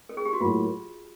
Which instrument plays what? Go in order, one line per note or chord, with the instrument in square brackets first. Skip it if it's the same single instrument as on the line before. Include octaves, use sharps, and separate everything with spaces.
[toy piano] A4
G#4
G4
F#4
[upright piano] A2 F#3 A#3 [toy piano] F4